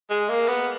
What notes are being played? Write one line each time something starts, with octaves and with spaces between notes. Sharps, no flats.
G#3
A#3
B3